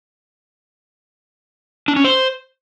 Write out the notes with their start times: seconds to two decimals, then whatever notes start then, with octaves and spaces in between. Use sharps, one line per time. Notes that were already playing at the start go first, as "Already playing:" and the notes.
1.88 D4
1.96 C#4
2.05 C5